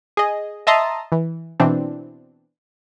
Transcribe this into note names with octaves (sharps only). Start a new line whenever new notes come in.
G#4 D#5
D#5 E5 A5 A#5 C6 D#6
E3
B2 E3 C4 D4